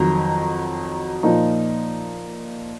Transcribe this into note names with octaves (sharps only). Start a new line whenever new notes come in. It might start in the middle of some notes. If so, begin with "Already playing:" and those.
Already playing: F2 D#3 F#3 A#5
A#2 F3 A#3 D#4